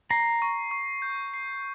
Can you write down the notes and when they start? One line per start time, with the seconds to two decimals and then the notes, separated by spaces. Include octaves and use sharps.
0.10 A#5 C7
0.42 C#6
0.71 C#6
1.02 G6
1.34 C7